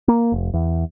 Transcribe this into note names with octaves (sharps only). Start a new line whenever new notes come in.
A#3
F1
E2